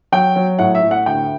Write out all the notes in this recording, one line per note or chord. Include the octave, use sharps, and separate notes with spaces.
F#3 G5
F#3
A2 F#5
E5
A2
F#5
D2 G5